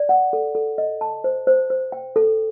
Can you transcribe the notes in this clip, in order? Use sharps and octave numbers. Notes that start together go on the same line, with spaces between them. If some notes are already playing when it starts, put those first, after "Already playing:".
Already playing: D5
F#5
A4
A4
D#5
A5
C5
C5
C5
G5
A4